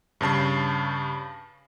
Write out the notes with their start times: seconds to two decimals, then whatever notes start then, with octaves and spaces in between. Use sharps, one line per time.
0.21 G2 C#3 A5 C7